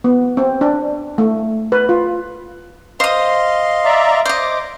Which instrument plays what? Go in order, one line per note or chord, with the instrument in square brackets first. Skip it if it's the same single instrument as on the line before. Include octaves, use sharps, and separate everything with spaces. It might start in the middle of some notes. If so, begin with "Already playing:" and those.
[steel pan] B3
C4
D4
A3
B4
F4
[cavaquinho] C5 D#6 [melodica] D#5 F5 C6
[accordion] D5 E5 A#5
[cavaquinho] C5 D#5 [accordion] D6